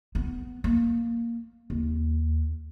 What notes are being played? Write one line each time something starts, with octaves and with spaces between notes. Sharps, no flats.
B3
A#3
D#2